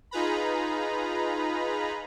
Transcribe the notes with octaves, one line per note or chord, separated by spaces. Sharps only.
D#4 F4 G#4 B4 A#5 B5